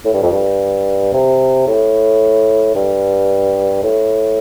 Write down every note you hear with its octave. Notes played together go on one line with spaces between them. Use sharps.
A2
G2
F2
G2
C3
A2
G2
A2